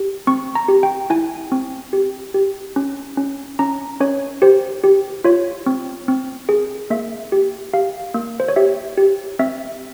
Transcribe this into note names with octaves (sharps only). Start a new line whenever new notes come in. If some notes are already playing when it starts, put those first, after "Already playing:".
Already playing: G4
C4 C#6
A#5
G4
G5
E4 G#5
C4
G4
G4
C#4
C#4
C#4 A#5
C#4 C#5
G4 C5
G4
F4 C#5
C4
C4
G#4
A#3 E5
G4
G4 F5
A#3
C5
C#5
G4 E5
G4
C4 E5